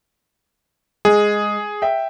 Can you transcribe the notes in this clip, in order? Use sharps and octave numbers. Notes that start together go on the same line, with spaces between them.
G#3 G#4
E5 G5